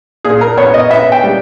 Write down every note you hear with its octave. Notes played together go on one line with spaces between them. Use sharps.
A#2 G#4
A#4
B3 C#5
D#5
B3 E5
G5
G3